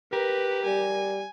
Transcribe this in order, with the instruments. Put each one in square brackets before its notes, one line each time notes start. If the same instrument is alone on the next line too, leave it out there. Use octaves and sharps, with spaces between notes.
[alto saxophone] G4 [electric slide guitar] A#4 [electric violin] B4
[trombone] G3 [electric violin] G#5